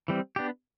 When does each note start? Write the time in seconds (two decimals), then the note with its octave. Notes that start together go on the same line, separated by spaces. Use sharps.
0.08 E3 G3 C4
0.36 B3 D4 G4